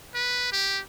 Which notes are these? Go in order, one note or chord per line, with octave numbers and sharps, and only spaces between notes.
B4
G4